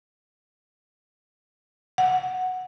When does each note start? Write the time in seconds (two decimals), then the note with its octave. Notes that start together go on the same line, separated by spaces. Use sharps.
1.98 F#5